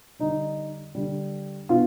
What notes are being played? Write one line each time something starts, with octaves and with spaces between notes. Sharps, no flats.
D3 G3 D#4
D3 G3
B2 F4